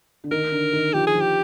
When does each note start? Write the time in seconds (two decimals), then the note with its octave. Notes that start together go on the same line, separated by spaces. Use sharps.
0.24 D3
0.31 D#3 A#4
0.52 D3
0.73 D#3
0.93 F3 G4
1.07 G#4
1.15 F3
1.21 G4